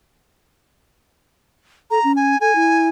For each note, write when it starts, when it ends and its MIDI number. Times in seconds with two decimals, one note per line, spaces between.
1.91 1.99 69
1.91 2.12 82
2.04 2.36 61
2.16 2.40 80
2.41 2.54 69
2.41 2.88 80
2.55 2.89 64